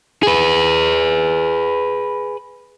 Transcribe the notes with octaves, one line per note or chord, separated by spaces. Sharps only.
G#4 B4